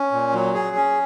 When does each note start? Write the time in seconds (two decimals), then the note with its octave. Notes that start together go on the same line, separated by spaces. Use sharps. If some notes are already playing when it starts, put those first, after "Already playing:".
Already playing: C#4
0.11 A#2
0.33 F#3
0.54 G#4
0.76 C#4